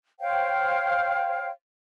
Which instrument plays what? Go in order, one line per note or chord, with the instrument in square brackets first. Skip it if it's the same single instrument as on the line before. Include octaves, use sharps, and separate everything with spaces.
[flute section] C5 C#5 F5 G5